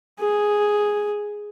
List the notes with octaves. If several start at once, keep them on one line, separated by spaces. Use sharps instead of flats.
G#4